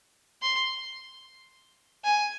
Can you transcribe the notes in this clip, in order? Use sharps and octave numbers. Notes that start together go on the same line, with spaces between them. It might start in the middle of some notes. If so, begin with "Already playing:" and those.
C6
G#5